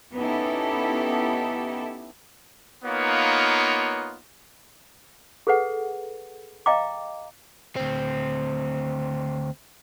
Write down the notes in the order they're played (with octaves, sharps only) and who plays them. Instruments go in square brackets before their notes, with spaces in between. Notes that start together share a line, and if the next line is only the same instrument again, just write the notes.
[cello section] B3 C#4 D#4 E4 G4 A4
[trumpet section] A#3 B3 D#4 F4 B4 C#5
[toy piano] G#4 A4 B4 F#5
D#5 F5 G5 A#5 D6
[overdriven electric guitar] D2 C4